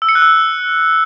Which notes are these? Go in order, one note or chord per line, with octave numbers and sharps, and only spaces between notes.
E6
C#7
F#6
E6